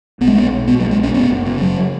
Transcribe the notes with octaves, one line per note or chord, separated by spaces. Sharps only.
B1 B3
G#3
B1 B3
B1
B2 B3
F#3
B1
G#3
B1 C#4
F#1 B3
F#1
C#3
F#1 F#3